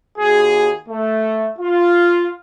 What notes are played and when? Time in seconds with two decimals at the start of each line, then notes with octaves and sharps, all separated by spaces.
0.18 D#2 F#4 G#4
0.89 A3
1.58 F4